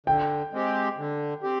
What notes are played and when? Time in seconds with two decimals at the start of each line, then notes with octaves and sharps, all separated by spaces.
0.06 D3 G5
0.53 G#3 C4 G4
0.98 D3
1.43 C4 G4